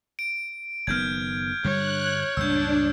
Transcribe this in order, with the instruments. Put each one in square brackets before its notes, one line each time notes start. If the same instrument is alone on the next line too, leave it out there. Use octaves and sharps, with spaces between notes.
[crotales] D7
[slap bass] F#1 D#3 B3 [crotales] F6 G6 G#6
[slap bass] G2 D3 G3 [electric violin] C#5 [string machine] F#6
[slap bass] C#2 G2 A#2 [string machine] D4 [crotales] E6 G6